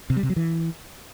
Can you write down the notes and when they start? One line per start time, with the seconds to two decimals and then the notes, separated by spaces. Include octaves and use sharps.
0.10 C3
0.16 G3
0.23 C3
0.30 F#3
0.36 E3